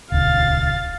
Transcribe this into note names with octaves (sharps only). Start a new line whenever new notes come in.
D#1 C#2 F5 A6